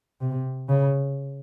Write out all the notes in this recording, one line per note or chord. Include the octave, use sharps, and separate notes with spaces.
C3
C#3